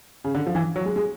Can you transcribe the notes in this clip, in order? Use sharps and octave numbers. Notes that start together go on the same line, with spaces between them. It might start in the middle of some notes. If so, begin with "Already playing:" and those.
C#3
D3
F3
E3
F#3
G#3
G#3